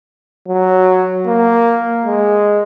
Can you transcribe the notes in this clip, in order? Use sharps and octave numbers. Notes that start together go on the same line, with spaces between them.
F#3
A#3
G#3